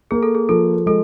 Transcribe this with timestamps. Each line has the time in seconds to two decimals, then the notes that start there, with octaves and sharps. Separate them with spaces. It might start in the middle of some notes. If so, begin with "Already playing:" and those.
0.11 A#3 G#4
0.23 A4
0.35 G#4
0.49 F3 A4
0.86 G#3 A4